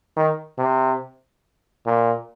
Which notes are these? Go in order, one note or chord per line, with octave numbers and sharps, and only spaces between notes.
D#3
C3
A#2